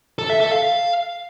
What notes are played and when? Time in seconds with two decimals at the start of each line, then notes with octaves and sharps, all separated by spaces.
0.19 A4
0.30 E5
0.41 A4
0.52 F5